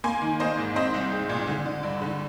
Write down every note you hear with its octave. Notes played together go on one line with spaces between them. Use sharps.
A#3 G#5 C6
D#3
A#3 C5 D#5
G#2
C4 C5 D#5
C2
G#3
A#2
D3
D3
G2
D3